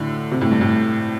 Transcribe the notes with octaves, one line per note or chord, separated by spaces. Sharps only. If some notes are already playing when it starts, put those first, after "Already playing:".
Already playing: A2 D3
C3
A2
G2
A2